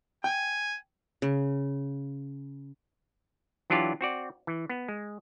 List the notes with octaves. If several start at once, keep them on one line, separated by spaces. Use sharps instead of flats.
G5 G#5
C#3
E3 F#3 D4 F4 G4 D5
C4 F#4 D5
E3
B3
G#3